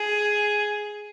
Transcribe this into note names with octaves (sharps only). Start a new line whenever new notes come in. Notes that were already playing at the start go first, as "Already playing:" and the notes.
Already playing: G#4